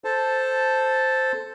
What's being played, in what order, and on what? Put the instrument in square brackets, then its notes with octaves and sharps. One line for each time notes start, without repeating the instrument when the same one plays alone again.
[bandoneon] A4 C5 A5